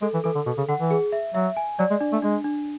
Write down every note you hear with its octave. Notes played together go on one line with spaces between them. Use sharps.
G#3 A4
E3
E3 A4
D3
B2 A4
C#3
D3 F#5
E3
G#4
E5
F#3 E5
G#5
F#3 D5
G#3
D4
A3
G#3 D4
D4